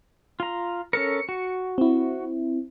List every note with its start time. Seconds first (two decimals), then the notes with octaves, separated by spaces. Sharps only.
0.40 F4 A#5
0.93 C#4 A4 A#4 C#7
1.29 F#4
1.78 C4 E4